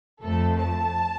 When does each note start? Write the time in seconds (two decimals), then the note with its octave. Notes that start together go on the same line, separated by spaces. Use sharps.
0.23 F2 F3 A3 A4
0.60 A5